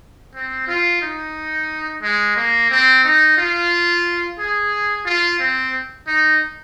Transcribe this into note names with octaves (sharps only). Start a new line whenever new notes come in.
C4
F4
D#4
G#3
A#3
C4
D#4
F4
G#4
F4
C4
D#4